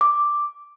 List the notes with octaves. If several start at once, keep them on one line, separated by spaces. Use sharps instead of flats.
D6